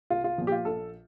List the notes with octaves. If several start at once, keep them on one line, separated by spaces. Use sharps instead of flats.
C2 F4
F4
A#2 F3
G4
F4
A#1 A4